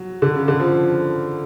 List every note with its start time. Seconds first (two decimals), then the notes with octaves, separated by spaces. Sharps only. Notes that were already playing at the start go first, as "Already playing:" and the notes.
Already playing: F#3
0.22 D3
0.36 C#3
0.48 D3
0.60 F3